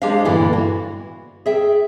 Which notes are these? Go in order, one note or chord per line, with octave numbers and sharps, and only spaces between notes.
G#3 D4 G4 G#4 C5 F5
G2 A#2 D3 E3 B3 E4
F#4
G#4 E5 G5